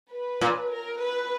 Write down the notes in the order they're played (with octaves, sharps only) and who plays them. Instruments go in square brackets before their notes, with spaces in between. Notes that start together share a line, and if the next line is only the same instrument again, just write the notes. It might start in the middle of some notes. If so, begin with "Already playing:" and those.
[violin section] B4
[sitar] A#2
[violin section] A#4
B4